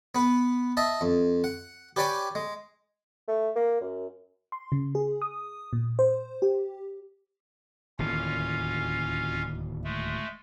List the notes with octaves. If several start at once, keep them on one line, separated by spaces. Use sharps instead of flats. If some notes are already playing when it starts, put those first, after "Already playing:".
B3 B4
D#5 E5 A5
F2
F#5
G4 B4 C#5 D5 G5 G#5
G#3
A3
A#3
F#2
C6
C#3
G#4
D#6
A#2
C5
G4
D1 D#2 E3 C#4 F4 F5
G#3 A3